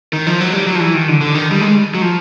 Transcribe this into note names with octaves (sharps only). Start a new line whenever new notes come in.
D#3
F3
F#3
G3
F#3
F3
E3
D#3
D3
D3
D#3
G3
G#3
F#3
F3